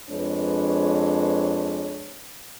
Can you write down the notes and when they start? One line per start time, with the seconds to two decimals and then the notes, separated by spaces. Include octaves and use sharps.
0.10 F2 G#3 D4 B4 C#5